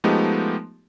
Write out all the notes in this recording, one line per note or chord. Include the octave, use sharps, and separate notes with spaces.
F3 G#3 A3 B3 D#4 G4